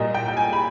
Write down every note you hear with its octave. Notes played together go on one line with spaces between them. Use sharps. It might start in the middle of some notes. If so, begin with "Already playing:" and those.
Already playing: A#2 G3 A#3 D#5
G5
G5
G#5
B5